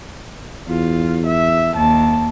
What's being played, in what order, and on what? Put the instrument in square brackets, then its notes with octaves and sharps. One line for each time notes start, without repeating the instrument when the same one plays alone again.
[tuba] E2 [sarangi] F4
[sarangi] E5
[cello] D#2 [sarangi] A5